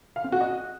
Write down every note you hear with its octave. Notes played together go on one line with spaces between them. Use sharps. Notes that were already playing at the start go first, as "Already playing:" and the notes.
F5
C4
F#4
D#5